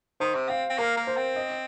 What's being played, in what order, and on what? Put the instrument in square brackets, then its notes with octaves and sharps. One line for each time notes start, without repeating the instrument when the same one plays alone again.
[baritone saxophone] D#3 [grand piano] C5
[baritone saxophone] C3
[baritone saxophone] C4 [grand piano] F5
[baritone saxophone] C4
[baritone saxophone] A#3 [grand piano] A#4
[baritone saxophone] A#3
[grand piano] C5
[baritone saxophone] C4
[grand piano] D#5